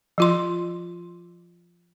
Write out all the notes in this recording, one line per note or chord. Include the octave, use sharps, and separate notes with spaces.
F3 F4 C6